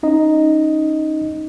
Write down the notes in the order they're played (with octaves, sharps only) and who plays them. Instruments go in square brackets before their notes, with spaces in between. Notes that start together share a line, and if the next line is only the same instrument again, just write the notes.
[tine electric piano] C#4 D#4 D#5